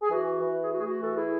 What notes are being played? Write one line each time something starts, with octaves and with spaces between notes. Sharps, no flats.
G#4
E3 F#4
E3
G#4
A3 F#4
G#4
F#4
E3 F#4 A4
E4 G#4